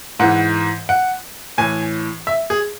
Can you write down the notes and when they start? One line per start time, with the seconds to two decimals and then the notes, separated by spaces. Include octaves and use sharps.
0.19 G#2 E3 F#5
0.89 F#5
1.58 A2 E3 G#5
2.27 E5
2.50 G#4